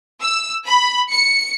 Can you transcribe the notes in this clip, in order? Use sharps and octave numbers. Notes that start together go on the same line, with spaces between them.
E6
B5
C#7